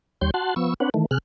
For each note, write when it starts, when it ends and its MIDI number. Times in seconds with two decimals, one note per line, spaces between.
0.21 0.31 39
0.21 0.31 55
0.21 0.31 73
0.21 0.31 84
0.21 0.31 91
0.34 0.54 66
0.34 0.54 78
0.34 0.54 81
0.34 0.54 84
0.56 0.74 53
0.56 0.74 59
0.56 0.74 85
0.56 0.74 88
0.80 0.90 60
0.80 0.90 62
0.80 0.90 71
0.80 0.90 73
0.80 0.90 78
0.94 1.06 51
0.94 1.06 52
0.94 1.06 57
1.11 1.18 48
1.11 1.18 68
1.11 1.18 89
1.11 1.18 90